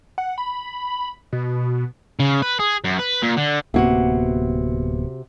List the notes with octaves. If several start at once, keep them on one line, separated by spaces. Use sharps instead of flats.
F#5
B5
B2
C#3
B4
G#4
F#2
B4
A#2
D3
D1 C3 A#3 B3 F#4